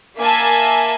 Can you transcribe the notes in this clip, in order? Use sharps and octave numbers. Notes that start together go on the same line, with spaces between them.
A#3 E5 G#5 A5